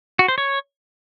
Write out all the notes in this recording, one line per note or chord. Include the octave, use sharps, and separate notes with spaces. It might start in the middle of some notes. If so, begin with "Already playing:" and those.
F#4
C5
C#5